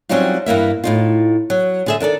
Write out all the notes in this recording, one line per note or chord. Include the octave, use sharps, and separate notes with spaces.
F#3 G3 C4 C#4 D#4 F4
G2 E3 A#3 E5
A2 D#4 F4
F#3
D3 G#4 E5
D#3 D4 A4 D5